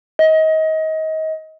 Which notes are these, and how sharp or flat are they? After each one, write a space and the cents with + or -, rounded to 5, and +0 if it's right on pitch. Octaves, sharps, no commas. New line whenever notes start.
D#5 +30